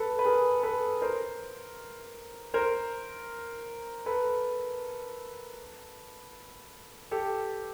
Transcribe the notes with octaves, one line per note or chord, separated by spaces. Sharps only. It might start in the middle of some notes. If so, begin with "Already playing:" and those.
Already playing: A4 B4
B4
G#4 A#4
A4 B4
A#4 C5
A#4 C5
A4 B4
G4 A4